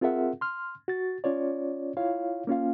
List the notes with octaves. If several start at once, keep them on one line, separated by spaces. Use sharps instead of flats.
C4 F4 G#4 A#4 E5 F#5
C6 F6
F#4 A6
C#4 F4 C#5 D5
E4 F4 C#5 F5
A#3 C#4 F4 F5